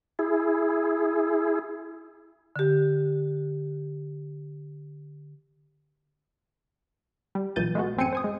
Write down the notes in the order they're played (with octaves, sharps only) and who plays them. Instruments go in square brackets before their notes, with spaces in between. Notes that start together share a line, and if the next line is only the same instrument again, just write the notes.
[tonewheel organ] E4 G#4
[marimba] D3 G4
[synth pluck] G3
B1 A#2 E3 G6 A6 D#7
G#3 A3 B3 F#4
A1 F#2 C4 G#5 C#7 D#7
C5 G#5 D#6
G#3